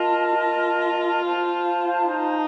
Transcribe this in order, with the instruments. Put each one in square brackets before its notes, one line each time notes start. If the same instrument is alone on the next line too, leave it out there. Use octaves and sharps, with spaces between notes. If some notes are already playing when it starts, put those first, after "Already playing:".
Already playing: [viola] F4 [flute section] A#4 D#5 A5
[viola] F4
[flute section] C5 F5 A5
[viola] D#4